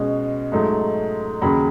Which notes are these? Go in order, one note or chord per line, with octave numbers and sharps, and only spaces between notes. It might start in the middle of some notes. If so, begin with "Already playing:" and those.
Already playing: B2 G#3 C#4
G#2 F#3 A3 D#4
D#2 C#3 F#3 B5